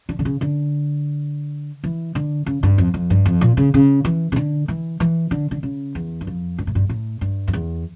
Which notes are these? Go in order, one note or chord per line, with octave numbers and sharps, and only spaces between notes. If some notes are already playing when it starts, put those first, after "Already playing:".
D3
D3
C#3
D3
E3
D3
C#3
G2
F2
F2
G2
F2
A#2
C#3
C#3
E3
C#3
D3
E3
E3
D3
D3
C#3
E2
G2
F2
G2
A2
G2
A2
G2
F2
E2